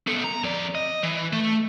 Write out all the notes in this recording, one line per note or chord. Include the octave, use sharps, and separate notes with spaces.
B3 A4
A#5
F2 D5
D#5
E3
A3